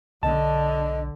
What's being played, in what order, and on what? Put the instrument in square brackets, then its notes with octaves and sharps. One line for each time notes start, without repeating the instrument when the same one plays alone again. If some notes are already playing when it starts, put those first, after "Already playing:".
[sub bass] B1 [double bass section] D3 [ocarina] D#5 [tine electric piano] A5